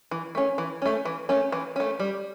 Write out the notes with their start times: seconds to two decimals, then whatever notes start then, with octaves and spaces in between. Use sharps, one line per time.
0.11 E3
0.35 A3 C#4
0.58 E3
0.82 A3 C#4
1.05 E3
1.29 A3 C#4
1.52 E3
1.76 A3 C#4
2.00 G3